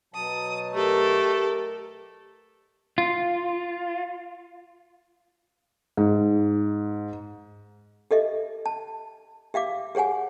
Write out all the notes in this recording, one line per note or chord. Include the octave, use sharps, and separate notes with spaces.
B2 F#3 A5 D#6
A3 G4 A4 A#4
F4
G#2
G4 A4 D#5 E5
A5
G4 E5 F5 D6
G4 G#4 C#5 F#5 G#5